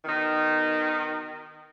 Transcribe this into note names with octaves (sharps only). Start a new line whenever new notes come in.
B2 D#3